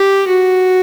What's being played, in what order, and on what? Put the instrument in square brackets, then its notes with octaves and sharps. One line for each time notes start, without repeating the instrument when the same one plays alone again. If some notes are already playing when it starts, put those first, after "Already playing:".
Already playing: [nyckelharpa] G4
F#4